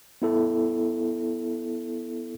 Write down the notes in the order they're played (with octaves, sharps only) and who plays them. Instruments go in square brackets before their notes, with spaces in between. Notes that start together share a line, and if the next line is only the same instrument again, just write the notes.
[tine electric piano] B3 E4 A4